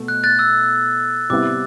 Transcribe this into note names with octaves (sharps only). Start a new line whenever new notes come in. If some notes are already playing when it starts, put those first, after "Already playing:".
Already playing: B2 A3
F#6
F#6 A6
E6
C3 G3 B3 E4 D6